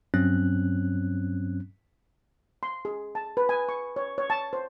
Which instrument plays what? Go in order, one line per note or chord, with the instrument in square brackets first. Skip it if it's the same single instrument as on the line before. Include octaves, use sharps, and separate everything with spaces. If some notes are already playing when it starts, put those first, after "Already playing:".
[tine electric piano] G2 F#3 C4 C#4 F#6
[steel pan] C6
G#4
A5
B4
G#5
C#6
C#5
C#5
A5
C5